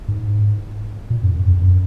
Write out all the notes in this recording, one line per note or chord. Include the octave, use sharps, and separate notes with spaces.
G#2
A#2
F#2
F#2
F2
F#2